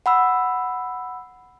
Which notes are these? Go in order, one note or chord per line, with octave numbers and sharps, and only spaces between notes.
F#5 B5 E6